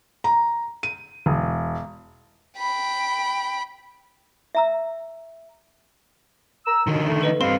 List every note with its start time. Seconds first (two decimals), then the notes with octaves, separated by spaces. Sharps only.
0.24 A#5
0.83 D#7
1.26 E1
2.57 G5 B5
4.55 E5 A#5 E6
6.65 A#5 E6
6.87 D#2 B2 D3 D#3
7.06 A3
7.21 A4 B4 D#5
7.41 G2 C4 G4 B4 F5 C6